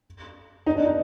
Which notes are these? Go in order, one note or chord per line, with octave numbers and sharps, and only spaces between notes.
D#4
D4
D#4